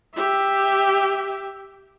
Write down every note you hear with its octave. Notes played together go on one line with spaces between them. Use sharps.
G4 E5